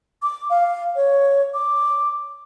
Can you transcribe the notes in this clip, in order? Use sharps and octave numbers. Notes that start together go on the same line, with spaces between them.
D6
F5
C#5
D6